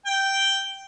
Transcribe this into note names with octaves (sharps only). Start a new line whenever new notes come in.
G5